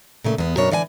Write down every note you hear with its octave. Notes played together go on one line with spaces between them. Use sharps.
A#2 C#3 A3
E2 B3
F#2 B2 D4 A#4 C#5
D3 E3 D5 F5 G#5